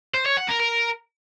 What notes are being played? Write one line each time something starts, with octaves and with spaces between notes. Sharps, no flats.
C5
C#5
F#5
A#4
A#4